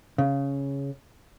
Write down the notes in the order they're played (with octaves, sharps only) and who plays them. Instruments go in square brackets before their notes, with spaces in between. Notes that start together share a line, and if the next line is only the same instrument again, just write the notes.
[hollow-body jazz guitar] C#3